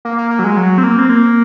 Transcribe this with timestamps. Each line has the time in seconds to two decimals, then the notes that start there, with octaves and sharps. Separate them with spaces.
0.05 A#3
0.18 A#3
0.31 A#3
0.39 F#3
0.44 G#3
0.57 F#3
0.78 C4
0.83 A#3
0.99 C4
1.09 A#3